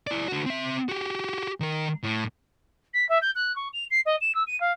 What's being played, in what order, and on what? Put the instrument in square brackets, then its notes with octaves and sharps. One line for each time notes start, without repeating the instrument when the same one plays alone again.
[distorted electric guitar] E4 D5
D3 F#4
C4 E5
F#4 G4
D#3 A#4
A2
[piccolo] B6
E5
G6
F#6
C#6
F7
C7
D#5
E7
E6
D#7
F5